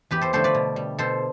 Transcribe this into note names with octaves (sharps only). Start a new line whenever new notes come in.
E2 G4 B4
A4 C5
D3 F3 A3 A4 C5
B4 D5
B2
G3
B2 A4 C5